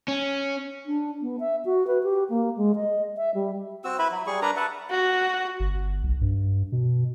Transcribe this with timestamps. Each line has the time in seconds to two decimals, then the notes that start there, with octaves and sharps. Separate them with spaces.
0.08 C#4
0.86 D4
1.22 B3
1.40 E5
1.65 F#4
1.87 B4
2.03 G4
2.30 A#3
2.57 G#3
2.76 D#5
3.17 E5
3.35 G3
3.84 C4 F#4 E6
3.99 E4 B4 E5 B5
4.12 F#3
4.27 G3 G#4 C#6
4.42 D4 A#4 B4 A#5
4.56 B4 E5 F#5 A5
4.90 F#4
5.60 G1
6.04 B1
6.21 G2
6.72 B2